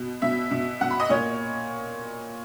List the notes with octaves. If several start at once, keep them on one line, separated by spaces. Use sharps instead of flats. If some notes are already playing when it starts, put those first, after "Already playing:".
Already playing: B2
B2 E5
B2
B2 F#5
B5
D#5
A#2 C#5